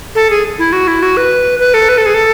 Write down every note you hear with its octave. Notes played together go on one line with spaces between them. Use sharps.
A4
G#4
E4
F#4
E4
F#4
B4
B4
A4
B4
A4
G#4
A4